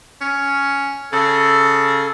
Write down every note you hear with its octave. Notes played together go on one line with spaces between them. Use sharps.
C#4
C#3 A4